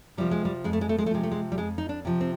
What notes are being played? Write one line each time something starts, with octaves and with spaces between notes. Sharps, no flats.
C3 F3 G3
G#3
G3
F2 G#3
A3
G#3
A3
G#3
A3
C3 F3 G#3
A3
G#3
G3
F2 G#3
D#4
D4
C3 F3
C4